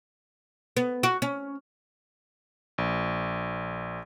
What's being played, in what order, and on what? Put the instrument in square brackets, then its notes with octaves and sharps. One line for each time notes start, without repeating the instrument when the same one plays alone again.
[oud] B3
F#4
C#4
[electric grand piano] A#1